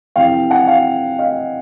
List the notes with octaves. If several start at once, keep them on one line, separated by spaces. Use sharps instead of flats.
F2 C3 E3 F5 G5
F#5 G#5
F5 G5
D#5 F5